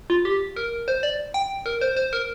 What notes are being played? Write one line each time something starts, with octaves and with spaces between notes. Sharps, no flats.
F4
G4
A#4
C5
D5
G5
A#4
C5
C5
A#4